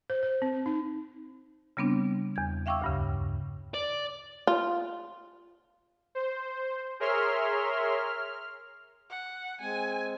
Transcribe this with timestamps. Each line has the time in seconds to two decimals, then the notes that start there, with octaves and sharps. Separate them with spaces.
0.10 C5
0.23 C5
0.42 C4
0.66 D#4
1.77 C#3 G3 B3 C4 D4
2.36 E2 G#6
2.66 E5 F5 G5 C#6 D6 E6
2.82 D2 G2 C#3
3.74 D5
4.47 F4
6.15 C5
7.00 G#4 A#4 C#5 E5 C6 F6
7.98 F6
9.10 F#5
9.61 G#3 C4 G#5